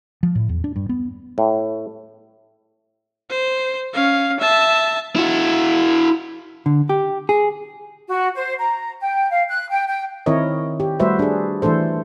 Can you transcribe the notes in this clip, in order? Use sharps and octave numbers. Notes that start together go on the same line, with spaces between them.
F3
A2
E2
D4
G2
B3
A2
C5
C#4 F5
E5 A5
E4 F#4
D3
G4
G#4
F#4
C5
A#5
G5
F5
F#6
G5
G5
D#3 C4 E4 A#4 C#5 D#5
G4
G3 A3 F#4 B4 C5 E5
D4 G#4
E3 A3 D4 A4 C5